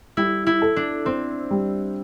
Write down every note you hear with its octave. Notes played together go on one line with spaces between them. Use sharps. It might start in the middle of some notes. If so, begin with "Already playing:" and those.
G3 E4
E4
A4
D4
C4 C5
G3